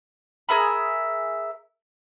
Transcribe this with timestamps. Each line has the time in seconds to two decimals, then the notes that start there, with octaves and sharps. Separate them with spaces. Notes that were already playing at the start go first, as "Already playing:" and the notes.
0.49 G#4 A#4 E5 B5